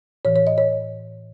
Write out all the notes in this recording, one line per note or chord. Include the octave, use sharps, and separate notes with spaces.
A2 E3 C#5
C#5
D#5
C#5